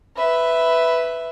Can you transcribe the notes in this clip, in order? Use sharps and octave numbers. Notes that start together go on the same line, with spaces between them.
B4 E5